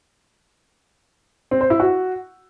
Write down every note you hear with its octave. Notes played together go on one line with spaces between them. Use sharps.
C4
C5
E4
F#4